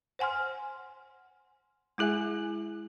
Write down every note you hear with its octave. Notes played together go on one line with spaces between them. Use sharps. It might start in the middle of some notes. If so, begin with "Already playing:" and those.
C5 F#5 G#5 C6 F6
G#3 E4 G#4 E5 G#5